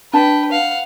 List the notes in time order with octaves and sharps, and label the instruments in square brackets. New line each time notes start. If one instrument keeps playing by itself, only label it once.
[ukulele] D4 A5 [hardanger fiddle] B4 G5
[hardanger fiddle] F5 F#5